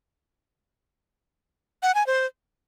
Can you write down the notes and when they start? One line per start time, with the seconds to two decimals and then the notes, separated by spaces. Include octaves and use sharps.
1.83 F#5
1.95 G#5
2.07 C5